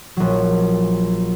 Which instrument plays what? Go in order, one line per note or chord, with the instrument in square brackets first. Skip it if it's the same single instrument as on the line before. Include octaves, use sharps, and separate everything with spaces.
[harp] A#1 F#3